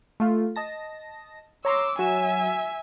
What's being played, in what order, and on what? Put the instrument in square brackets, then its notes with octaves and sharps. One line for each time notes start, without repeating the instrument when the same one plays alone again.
[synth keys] A3 F4
D#5 A5 A#6
[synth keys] C#5 A#5 C6 [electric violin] D6 E6
[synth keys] F#3 E7 [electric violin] E5 G#5